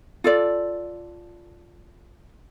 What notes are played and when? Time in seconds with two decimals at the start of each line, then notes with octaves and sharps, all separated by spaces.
0.24 F4 A4 D5